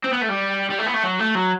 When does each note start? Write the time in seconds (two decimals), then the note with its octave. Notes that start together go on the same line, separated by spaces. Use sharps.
0.04 C4
0.13 B3
0.21 A3
0.29 G3
0.70 G3
0.79 A3
0.86 B3
0.94 A3
1.03 F#3
1.19 A3
1.35 F#3